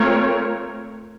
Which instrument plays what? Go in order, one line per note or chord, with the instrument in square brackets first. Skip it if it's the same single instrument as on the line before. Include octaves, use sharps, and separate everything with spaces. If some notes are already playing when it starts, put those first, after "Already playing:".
Already playing: [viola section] A3 C4 F4 A#4 C#5